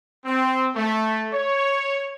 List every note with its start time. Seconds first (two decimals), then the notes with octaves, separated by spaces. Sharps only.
0.25 C4
0.75 A3
1.33 C#5